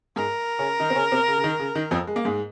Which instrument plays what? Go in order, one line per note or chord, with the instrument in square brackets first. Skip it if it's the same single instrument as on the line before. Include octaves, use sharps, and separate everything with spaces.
[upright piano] G#2 G#3 [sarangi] A#4
[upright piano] C#3 C#4
D#3 D#4
C4
C#3 C#4
C3 C4
C#3
C#3
D#3
C#3
D#3
F2 F3
G#3
A#3
G#2 G#3